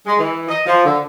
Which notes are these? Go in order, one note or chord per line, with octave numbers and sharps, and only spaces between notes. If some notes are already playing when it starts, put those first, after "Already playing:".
G#3
E3
D#5
F3
D3